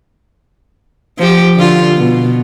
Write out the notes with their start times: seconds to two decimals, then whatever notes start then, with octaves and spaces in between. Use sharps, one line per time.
1.18 F3 G4
1.56 D3 F4
1.97 B2